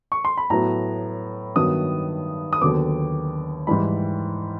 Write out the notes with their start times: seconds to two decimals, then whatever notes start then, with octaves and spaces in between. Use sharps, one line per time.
0.12 C#6
0.25 C6
0.37 B5
0.50 A2 F#3 B3 A#5
1.56 G2 D#3 F#3 B3 D#6
2.53 D#6
2.61 D#2 D3 F#3 B3 D6
3.67 G#2 E3 G3 B5